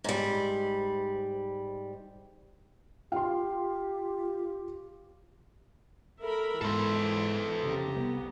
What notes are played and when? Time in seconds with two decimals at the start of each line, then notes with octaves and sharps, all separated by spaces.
0.04 G#2 G3
3.12 F4 G4 F5 G5 C6
6.22 A4 A#4 E5 B5
6.62 G#2 E3 G#3 A4 C5
7.63 F1 F2 C#3 G4 A#5
7.95 C2 B3